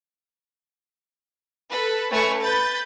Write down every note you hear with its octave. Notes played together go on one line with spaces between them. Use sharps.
A4 B4
A3 C#4 B4 G#5 C#6
B4 B5 G6 A6